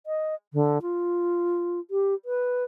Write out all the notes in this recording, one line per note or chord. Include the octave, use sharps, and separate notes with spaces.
D#5
D3
F4
G4
B4